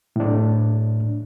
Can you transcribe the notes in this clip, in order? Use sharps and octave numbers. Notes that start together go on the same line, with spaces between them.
A2 D4